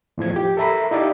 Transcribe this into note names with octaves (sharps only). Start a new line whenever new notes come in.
E2 A2 F3 G#6
G4
A4 A#4 E5 A#5 B5
D#4 E4 G4 D5 D#5 F5